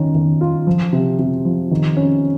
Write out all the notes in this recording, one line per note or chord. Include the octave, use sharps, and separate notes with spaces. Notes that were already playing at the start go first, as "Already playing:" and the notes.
Already playing: D#3 C#4
D#3
F4
F3
C3
C3
F3
D#3
C#4